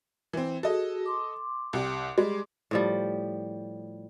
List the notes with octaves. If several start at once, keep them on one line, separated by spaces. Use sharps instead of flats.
E3 C4
F#4 G#4 A4 D#5
C6 D6
C2 G4
G3 G#3
A2 F3 G3